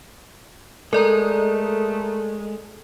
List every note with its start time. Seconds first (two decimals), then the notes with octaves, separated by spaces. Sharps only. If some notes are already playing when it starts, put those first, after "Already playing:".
0.93 G#3 A3 A4 A#4 D5 A#5